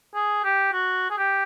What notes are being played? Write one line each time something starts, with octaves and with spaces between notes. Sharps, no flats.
G#4
G4
F#4
G#4
G4